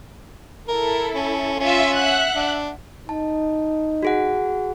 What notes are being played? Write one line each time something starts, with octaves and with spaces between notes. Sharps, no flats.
E4 A4 A#4
C#4
C#4 F4 E5
E5 F#5 F#6
D4
D#4 A5
F#4 G#4 F#5